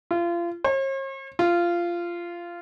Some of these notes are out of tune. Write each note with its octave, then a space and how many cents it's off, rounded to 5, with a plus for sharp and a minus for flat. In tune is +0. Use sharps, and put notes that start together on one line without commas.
F4 -30
C#5 -45
F4 -15